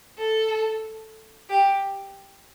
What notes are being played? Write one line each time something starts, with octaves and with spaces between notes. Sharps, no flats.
A4
G4